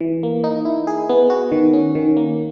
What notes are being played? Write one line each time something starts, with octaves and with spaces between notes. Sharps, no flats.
E3
A#3
D#4
E4
G#4
B3
F#4
D#3
C#4
D#3
A#3